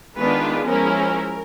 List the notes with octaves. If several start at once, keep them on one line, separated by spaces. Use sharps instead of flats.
D#3 G#3 B3 D4 F4 B4
F3 G#3 C#4 E4 A#4